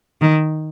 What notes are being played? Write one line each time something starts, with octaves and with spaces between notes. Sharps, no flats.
D#3